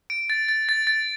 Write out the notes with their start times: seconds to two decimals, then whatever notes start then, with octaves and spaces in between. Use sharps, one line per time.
0.10 D7
0.30 A6
0.48 A6
0.69 A6
0.87 A6